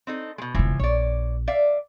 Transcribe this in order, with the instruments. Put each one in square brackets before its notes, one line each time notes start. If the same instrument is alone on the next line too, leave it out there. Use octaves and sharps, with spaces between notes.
[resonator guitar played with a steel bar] C4 D#4 A4
B2 G#3
[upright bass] E1 C#3 [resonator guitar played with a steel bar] E3 F3
[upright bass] A#1 [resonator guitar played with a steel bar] C#5 D5
[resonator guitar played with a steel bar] D5 E5 F5